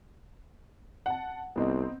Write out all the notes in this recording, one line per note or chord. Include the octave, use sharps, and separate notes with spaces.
F#5 A5
C2 B3 C4 D#4